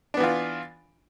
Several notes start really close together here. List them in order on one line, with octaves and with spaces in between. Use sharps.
D4 B3 E3 F4